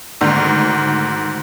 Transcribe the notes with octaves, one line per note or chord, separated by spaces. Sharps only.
D2 G#2 D#3